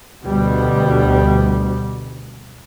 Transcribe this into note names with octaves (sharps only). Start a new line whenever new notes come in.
D2 B2 G3